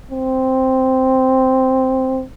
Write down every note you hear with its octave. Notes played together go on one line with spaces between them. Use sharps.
C4